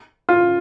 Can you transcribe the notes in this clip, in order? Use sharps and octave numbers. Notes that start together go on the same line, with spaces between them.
F4